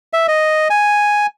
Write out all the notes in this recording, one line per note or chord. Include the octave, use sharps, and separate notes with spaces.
E5
D#5
G#5